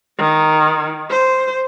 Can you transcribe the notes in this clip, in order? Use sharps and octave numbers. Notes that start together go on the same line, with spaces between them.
D#3
C5